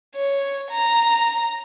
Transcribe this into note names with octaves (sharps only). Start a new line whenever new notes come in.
C#5
A#5